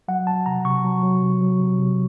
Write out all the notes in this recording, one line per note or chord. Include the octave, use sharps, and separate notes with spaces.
F#3 F#5
F#3 A5
C3 A#5
C3 C#6
F#3
F#3
C3
F#3
C3
C3